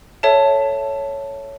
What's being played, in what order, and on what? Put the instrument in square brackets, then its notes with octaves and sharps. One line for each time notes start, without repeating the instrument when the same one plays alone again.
[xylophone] A4 C#5 E5 A5